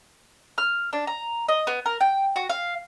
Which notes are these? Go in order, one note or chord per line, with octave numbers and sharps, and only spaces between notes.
F6
D4
A#5
D#5
B3
A#4
G5
F#4
F5